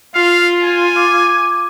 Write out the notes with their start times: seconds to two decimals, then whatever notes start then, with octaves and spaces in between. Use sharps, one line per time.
0.15 F4 F5
0.64 G#5
0.96 D6